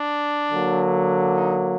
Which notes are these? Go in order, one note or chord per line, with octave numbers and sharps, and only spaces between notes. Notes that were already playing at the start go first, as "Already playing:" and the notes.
Already playing: D4
D3 F#3 A#3
D#4